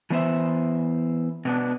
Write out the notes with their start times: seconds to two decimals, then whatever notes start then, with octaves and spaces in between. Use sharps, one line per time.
0.10 E3 B3 C5 E5
1.45 B2 B3 D4